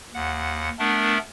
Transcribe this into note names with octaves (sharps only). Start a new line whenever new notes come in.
D#2 F#5
A3 B3 D4 A#4